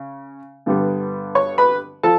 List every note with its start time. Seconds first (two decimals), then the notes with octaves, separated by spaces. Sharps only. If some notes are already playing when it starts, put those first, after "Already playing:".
Already playing: C#3
0.66 G2 D3 G3 B3
1.35 C#5 C#6
1.58 B4 B5
2.03 F3 A4 A5